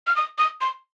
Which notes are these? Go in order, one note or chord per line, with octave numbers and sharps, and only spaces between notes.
F6
D#6
D#6
C6